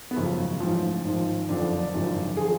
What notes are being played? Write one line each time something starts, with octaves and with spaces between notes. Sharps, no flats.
B3
G#1 F#2 C#3 F3 C#4
A1 G#2 F3
G#1 G#2 F3
F#1 F2 D3 F3 D4
D4
G#1 F#2 C#3 F3
D3 F3 G#4